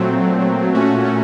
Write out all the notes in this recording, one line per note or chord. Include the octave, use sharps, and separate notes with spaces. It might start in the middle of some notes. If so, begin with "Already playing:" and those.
Already playing: A#2 F#3 A3 C4
A#2 A3 C#4 F#4